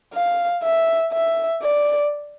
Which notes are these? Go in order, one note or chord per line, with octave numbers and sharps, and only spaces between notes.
F5
E5
E5
D5